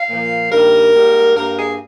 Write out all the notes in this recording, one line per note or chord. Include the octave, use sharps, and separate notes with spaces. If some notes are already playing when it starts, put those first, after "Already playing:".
Already playing: F5
A#2 F3 A#3
G2 D#3 G3 A#3 A#4
G#2 G3 A#3
G2 G3 A#3 A#4
G#4